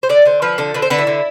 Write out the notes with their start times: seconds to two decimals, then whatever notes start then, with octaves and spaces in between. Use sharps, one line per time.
0.03 C5
0.09 D3 D5
0.26 D3 C5
0.42 F3 B4
0.58 D3 A4
0.74 D3 B4
0.82 C5
0.90 D3 B4
0.99 E4
1.07 D3